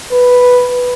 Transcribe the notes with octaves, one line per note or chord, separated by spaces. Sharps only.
B4